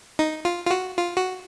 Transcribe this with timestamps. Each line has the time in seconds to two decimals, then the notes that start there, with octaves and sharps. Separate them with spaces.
0.19 D#4
0.45 F4
0.66 F4
0.71 F#4
0.97 F4
1.17 F#4